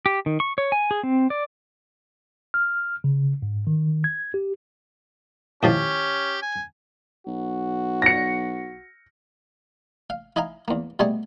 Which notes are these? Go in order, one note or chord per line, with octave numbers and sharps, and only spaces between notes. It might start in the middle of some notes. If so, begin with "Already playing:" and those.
G4
D#3
C#6
C#5
G#5
G#4
C4
D5
F6
C#3
G#2
D#3
G#6
G4
D#2 A2 F3 C#4 G4
G#5
B1 F#4
A#6 C#7
F5
E4 D#5 F5 G#5 A#5
E2 A#3
B2 G3 A3 G#4 G#5 A5